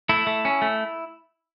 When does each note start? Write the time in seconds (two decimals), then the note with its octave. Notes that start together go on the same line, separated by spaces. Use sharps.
0.09 A3 E4
0.27 A3
0.45 C#4
0.62 A3